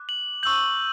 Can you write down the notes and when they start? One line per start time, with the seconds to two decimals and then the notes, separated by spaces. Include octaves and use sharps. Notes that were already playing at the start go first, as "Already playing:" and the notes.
Already playing: D6 F#6
0.09 F#7
0.43 C#6 E6 G6 F#7